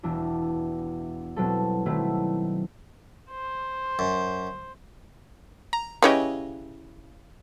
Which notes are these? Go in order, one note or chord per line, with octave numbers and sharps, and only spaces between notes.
E1 E2 D4 E4
B2 F#3 G3 C4 E4 A4
B2 D#3 F#3 A3 C4 E4
C5
F#2
A#5
C#3 E4 G4 B4 C#5 D#5